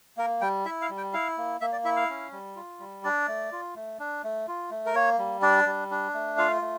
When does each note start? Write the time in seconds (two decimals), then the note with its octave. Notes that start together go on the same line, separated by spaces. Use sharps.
0.17 A#3 A#4
0.41 G3 G5
0.65 E4 E5
0.82 F5
0.90 G3
0.97 G5
1.13 E4 F5
1.38 A#3
1.61 A#3 E5
1.72 D5
1.84 E4 E5
1.96 F5
2.09 C#4
2.32 G3
2.56 F4
2.80 G3
3.04 D4 D5
3.28 A3
3.52 F4
3.75 A3
3.99 D4
4.24 A3
4.48 F4
4.71 A3
4.86 A#4
4.95 A#3 C#5
5.18 G3
5.42 D4 D5
5.66 G3
5.91 D4
6.14 A3
6.37 F4 F5
6.62 A3